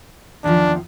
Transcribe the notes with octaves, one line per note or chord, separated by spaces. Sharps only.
E2 D#3 F3 D4